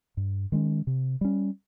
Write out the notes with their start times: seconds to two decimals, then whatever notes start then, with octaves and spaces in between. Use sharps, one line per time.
0.17 G2
0.52 D#3 G#3 C#4
0.87 C3
1.21 G3 C#4